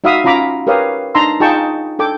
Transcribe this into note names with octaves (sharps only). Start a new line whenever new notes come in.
D#4 F#4 E5 F5 B5 D#6
C#4 F4 A#5 B5 D6
G4 A#4 B4 C#5 F5 D#6
D4 D#4 A5 A#5 C6 E6
D#4 F4 G#4 G5 A5 C#6
D4 A4 G5 D6